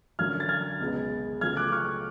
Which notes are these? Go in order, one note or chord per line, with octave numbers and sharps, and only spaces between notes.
F#2 D3 F#3 F6 G#6
A6
F6 G#6
C#2 B2 G#3 B3
C#3 F#3 A3 F4 F6 G#6
D6 F#6
C#6 F6